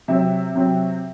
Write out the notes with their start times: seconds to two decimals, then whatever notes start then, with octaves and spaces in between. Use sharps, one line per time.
0.08 C3 F#3 C4 E5
0.55 C3 F#3 C4